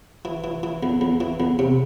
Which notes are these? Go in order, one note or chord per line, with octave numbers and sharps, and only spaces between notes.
E3
E3
E3
E2
E2
E3
E2
C3